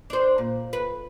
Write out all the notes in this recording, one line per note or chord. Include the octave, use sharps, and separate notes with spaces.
D4 C5
A#2
B4